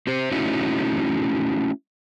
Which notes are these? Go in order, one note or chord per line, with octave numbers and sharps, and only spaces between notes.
C4 G4 C5
A3 C#4 D#4 E4 F#4